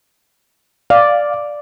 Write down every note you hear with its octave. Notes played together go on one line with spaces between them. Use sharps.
D5 F5